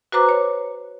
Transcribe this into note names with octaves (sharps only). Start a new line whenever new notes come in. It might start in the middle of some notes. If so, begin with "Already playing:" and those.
F#4 B4 C5 A#5 D6 F#6
C#5